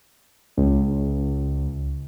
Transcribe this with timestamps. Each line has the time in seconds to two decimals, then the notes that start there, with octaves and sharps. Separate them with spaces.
0.57 C#2